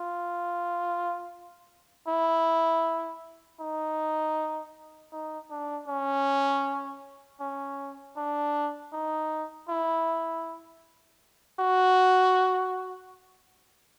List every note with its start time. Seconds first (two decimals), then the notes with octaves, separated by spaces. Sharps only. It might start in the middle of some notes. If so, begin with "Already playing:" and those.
Already playing: F4
2.07 E4
3.60 D#4
5.12 D#4
5.51 D4
5.88 C#4
7.40 C#4
8.17 D4
8.93 D#4
9.69 E4
11.59 F#4